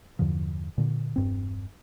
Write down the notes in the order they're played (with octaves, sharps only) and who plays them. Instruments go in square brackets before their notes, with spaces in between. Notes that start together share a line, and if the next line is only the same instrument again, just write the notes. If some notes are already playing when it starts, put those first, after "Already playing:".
[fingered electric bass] E2 G2 D3 F3
A#2 D3
E1 G2 C4